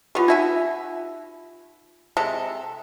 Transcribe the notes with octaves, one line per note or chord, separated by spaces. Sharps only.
E3 B3 F4 G4
D#4 F#4 E5 G#5
C3 G#3 A4